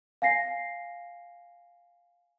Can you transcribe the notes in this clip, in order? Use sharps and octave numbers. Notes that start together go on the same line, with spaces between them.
F5 G#5 A#6 C7